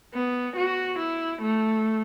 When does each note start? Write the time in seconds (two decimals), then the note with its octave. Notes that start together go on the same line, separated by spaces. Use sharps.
0.14 B3
0.57 F#4
0.99 E4
1.42 A3